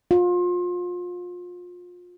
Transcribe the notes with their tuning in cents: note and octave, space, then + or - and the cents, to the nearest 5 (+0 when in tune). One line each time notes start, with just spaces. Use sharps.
F4 +30